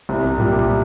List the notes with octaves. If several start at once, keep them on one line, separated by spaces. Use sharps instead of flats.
C2
A#2 G3